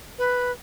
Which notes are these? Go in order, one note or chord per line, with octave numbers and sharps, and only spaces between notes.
B4